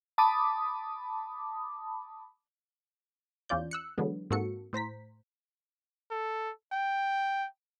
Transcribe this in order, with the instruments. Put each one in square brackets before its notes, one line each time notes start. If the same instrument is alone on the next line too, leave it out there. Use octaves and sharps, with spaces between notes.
[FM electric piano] A5 B5 D6 D#6
[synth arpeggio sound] E2 C#4 F4 D5 G6
E6 F#6 C#7
D3 E3 F#3 G#3 B3
G#2 A#3 C4 F#4 A4 C#7
A2 C5 A#5 B6
[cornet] A4
G5